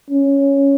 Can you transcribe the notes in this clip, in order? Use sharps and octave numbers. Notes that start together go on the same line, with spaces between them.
C#4